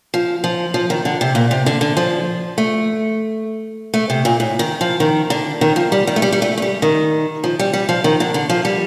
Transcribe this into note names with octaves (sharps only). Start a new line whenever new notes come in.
F3
F3
F3
D#3
D3
C3
A#2
C3
D3
D3
F3
A3
A3
C3
A#2
A2
D#3
F3
D#3
D3
D#3
F3
G3
D#3
A3
G3
G3
A3
A3
G3
D#3
F3
G3
G3
F3
D#3
D3
D3
F3
G3